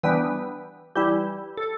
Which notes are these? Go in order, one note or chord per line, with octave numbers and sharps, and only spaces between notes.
E3 G3 B3 D4 B4
E3 G3 E4 G4
A4